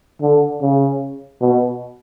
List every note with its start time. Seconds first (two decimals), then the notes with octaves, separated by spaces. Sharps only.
0.22 D3
0.62 C#3
1.41 B2